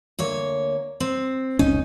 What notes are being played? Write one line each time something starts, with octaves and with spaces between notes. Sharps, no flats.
D2 A#3 C#5
C4
F1 C#2 C#4 D#4